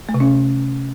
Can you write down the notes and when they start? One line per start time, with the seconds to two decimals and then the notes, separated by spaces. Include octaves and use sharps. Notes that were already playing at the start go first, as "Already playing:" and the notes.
0.09 A3
0.14 C3
0.20 C#4